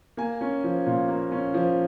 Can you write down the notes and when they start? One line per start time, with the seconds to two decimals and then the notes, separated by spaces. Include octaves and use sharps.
0.17 A#3 G#5
0.41 C#4
0.64 F3
0.87 A#2
1.08 A#3
1.32 C#4
1.54 F3